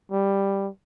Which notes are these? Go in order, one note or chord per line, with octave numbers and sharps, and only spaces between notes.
G3